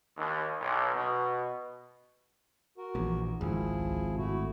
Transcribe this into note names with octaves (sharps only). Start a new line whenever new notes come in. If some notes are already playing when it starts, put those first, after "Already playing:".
D#2
B1
B2
F#4 A#4
A#1 E3
G#1 C#2 F3 E4 G#4
G#2 A3 E4 F#4